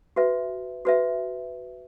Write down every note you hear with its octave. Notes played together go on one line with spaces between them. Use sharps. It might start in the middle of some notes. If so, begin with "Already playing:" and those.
F#4 B4 E5
F#4 B4 E5